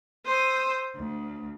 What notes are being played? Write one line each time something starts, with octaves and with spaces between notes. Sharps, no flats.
C5 D#6 E6
D2